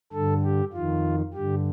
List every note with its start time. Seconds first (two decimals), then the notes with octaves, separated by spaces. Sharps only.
0.13 G2 D3 A4
0.43 G4
0.73 F2 D#3 F4
1.34 G2 D3 G4